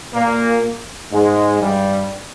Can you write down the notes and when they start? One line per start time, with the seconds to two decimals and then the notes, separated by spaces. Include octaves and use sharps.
0.13 A#2 A#3
1.12 G#2 G#3
1.63 G2 G3